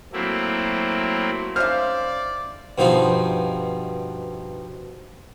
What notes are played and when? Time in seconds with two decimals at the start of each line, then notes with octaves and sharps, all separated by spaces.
0.13 F#3 A3 A#3 C4 E4
1.56 C#4 D#4 C5 D5 E5 F5 F6
2.78 G2 B2 F3 D#4